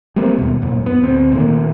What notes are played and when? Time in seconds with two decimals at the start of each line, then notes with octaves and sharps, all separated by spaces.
0.16 G3 A3 A#3 C4
0.38 D#2 B2
0.62 F#2 A#2
0.86 B3
1.02 D2 C4
1.33 A#2 D#3 A3 A#3